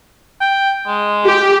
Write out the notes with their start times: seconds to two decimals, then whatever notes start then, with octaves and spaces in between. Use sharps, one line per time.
0.41 G5
0.87 G#3
1.25 G4